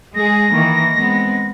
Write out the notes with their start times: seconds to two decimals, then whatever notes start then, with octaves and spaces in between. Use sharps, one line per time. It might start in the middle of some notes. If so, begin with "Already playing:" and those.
0.15 G#3 G#4 A#6
0.51 D#3 E3 A#3
0.96 G#3 B3 C4